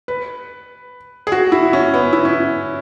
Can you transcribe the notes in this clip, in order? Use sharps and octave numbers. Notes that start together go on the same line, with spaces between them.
B4
G#4
F#4
E4
C#4
B3
E4
C#4